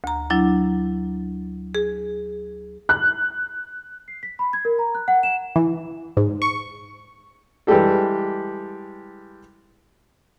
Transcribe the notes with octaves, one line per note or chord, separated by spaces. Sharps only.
D2 A#5
F#3 D4 E4
G#4
F#6
C7
B6
B5
G#6
A#4
A#5
F#6
F#5
E7
E3
G#2
C#6
E3 G3 G#3 G4 A4